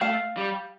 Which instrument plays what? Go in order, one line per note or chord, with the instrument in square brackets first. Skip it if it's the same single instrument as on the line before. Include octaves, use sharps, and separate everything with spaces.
[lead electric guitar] A3 [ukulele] F5
[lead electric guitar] G3